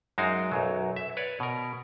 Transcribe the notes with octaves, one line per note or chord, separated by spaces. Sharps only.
F#2 G#3 D#4 F#4 A#4 F5
B1 F#2 F#3
E5
B4 C#5 D5
B2 A#4